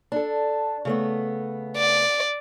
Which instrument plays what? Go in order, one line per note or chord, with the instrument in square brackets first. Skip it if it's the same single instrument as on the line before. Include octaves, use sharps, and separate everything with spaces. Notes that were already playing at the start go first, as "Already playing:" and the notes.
[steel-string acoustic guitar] D4 A4
C#3 A3 B3
[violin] D5